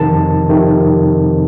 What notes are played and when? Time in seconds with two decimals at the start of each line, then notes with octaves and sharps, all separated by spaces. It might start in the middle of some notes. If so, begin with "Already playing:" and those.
Already playing: F2 C3 D#3 A5
0.49 F2 C3 D#3